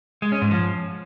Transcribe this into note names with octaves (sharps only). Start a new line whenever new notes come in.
G#3
C#4
G#2
F3